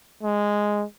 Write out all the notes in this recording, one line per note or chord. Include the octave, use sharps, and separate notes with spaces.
G#3